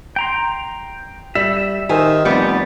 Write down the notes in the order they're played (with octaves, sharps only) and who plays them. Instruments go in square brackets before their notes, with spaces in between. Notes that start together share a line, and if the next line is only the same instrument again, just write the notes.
[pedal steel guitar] G5 A#5 C6
[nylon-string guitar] G3 [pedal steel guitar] E5
[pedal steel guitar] E5
[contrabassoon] D#3 [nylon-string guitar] G4 C5 G#5
[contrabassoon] F1 [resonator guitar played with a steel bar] G3 B3